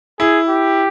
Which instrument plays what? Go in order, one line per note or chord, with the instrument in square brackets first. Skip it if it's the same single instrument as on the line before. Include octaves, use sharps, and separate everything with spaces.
[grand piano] E4 [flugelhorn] G#4
[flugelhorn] G4